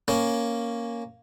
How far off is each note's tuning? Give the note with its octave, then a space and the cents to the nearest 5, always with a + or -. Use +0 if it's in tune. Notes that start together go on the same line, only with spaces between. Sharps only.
A#3 +0 C#4 +0